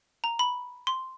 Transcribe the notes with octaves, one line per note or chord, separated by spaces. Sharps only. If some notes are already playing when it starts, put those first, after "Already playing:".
A#5
B5
C6